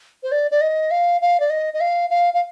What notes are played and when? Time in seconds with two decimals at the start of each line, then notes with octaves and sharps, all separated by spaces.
0.23 C5
0.32 D5
0.51 D5
0.61 D#5
0.91 F5
1.21 F5
1.40 D5
1.50 D#5
1.74 D#5
1.81 F5
2.10 F5
2.34 F5